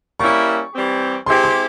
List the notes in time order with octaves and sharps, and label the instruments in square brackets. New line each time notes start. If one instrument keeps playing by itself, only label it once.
[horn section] G3 A#3 C#4 E4 [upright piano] C#6
[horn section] E3 G3 C4 G4
[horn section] G#3 C4 E4 G4 [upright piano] C6
[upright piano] C6